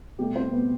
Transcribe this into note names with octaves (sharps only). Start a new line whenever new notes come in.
B2 G3 A3 G4
C4 C5
B2 A3 B3 B4